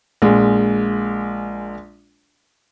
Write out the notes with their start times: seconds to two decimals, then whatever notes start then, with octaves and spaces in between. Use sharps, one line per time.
0.22 A#1 G#3